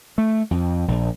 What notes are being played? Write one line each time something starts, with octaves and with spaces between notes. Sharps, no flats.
A3
F2
A#1